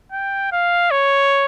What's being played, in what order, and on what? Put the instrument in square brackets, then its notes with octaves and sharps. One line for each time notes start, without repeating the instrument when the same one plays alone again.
[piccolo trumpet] G5
F5
C#5